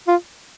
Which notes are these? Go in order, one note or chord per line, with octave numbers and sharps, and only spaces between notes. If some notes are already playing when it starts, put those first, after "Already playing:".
F4